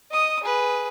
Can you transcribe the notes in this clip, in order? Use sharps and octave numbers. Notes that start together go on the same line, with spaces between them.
D#5 D#6
G#4 B4